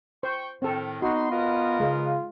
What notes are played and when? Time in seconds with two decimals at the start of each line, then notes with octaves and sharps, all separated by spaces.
0.23 C5 G5 C#6
0.62 A2 D#3 C4 A4
1.02 B3 D#4 F#4 C6
1.31 F4 A#4 B4 D#5
1.80 C#3 G#3